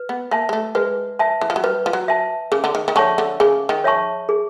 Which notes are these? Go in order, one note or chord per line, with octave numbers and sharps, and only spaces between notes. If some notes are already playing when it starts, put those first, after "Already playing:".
Already playing: B4
B3
A#3 E5 A5
G#3
A3
G#3 B4
E5 A5
E3
F3
F#3
G3 B4
F3
F#3
E5 A5
C#3 G#4
D3
D#3
D#3
D3 C#5 E5 A5 C#6
D3
C#3 G#4
D#3
C#5 E5 A5 C#6
G#4